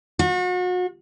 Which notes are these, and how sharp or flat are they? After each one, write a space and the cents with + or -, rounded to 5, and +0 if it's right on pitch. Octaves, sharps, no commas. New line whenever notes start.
F#4 -35